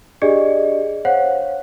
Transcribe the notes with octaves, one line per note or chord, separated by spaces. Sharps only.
D4 G4 G#4 D5 D#5
C5 C#5 F5 F#5